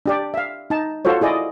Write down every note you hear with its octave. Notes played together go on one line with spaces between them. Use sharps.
D4 G4 D5
E5 F5
D#4 A5
F4 F#4 A4 C5 C#5
E4 G#4 D5 D#5